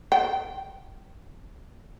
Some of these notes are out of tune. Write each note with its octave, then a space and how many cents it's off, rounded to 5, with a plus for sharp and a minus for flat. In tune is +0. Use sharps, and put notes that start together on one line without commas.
G5 -5